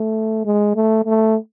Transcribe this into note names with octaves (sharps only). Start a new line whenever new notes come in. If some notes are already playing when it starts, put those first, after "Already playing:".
Already playing: A3
G#3
A3
A3